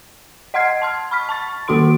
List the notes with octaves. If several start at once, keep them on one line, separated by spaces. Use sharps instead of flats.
D#5 F#5 C6 F6 G#6 C7
A5 C6 F6
B5 C#6 F6 B6
A5 C#6 A6
D#3 A#3 F#4 A4 C6 D7